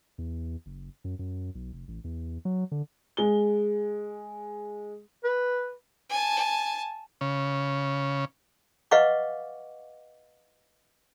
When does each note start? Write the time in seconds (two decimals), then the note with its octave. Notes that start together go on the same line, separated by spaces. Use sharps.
0.18 E2
0.66 F#1
1.04 F#2
1.19 F#2
1.55 B1
1.73 F1
1.88 A1
2.04 E2
2.45 F#3
2.72 D3
3.17 G#3 G7
5.24 B4
6.10 G#5 A5
7.21 C#3
8.91 B4 D#5 F5 F#5 C#6 D6